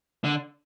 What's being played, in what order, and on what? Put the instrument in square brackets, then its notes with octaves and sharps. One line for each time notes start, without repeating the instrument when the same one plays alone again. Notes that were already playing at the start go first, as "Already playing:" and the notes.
[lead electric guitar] D3